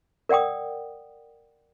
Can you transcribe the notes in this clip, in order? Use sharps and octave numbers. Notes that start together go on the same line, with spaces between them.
A#4 D5 F#5 G5 D#6